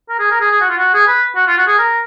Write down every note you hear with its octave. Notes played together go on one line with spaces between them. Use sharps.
A#4
G#4
A#4
G#4
G#4
F#4
F4
F#4
G#4
B4
F#4
F4
F#4
G#4
A#4